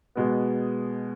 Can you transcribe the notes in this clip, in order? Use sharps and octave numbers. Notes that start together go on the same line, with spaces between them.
B2 G#3 B3